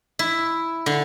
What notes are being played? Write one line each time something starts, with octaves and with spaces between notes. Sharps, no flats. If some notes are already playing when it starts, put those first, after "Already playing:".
E4
D3